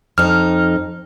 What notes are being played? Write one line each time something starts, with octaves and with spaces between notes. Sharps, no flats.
F2 D#4 F6